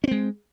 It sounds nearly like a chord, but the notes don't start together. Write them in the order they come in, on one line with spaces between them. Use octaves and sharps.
C#4 C4 G#3